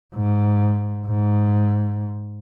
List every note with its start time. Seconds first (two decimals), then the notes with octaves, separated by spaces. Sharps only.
0.14 G#2
1.07 G#2